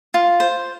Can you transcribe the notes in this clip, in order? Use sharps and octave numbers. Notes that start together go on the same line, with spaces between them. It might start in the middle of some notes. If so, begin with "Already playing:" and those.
F4
C5